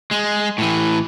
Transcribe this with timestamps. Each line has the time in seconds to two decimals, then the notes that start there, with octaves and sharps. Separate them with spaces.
0.11 G#3
0.58 A2 E3